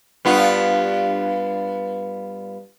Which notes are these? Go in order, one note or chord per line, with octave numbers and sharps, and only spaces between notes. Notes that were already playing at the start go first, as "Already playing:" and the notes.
G2 B3 F4